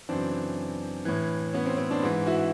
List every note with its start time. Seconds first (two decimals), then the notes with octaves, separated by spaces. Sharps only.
0.09 F#2 C#3 E3 C4 D4
1.05 A2 E3
1.53 B3 C#4
1.66 C4
1.78 C4
1.91 C4 D4
2.02 G#2 E3
2.26 E4 F#4